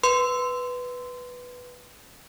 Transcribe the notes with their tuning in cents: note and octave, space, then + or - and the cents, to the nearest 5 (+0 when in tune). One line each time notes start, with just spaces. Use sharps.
B4 +0 C6 -20